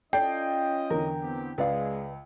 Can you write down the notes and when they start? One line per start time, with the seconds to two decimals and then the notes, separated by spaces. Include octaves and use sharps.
0.13 C#4 F4 A4 D5 D#5 G5 C7
0.90 E2 D3 A#4
1.23 B3 C4 G4
1.58 C#2 G#3 B4 D5 F5